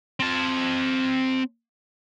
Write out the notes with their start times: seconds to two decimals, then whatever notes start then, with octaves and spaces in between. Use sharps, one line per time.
0.20 C4 A5